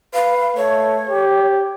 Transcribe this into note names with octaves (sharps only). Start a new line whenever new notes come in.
B4 F5
A3 C#5
G4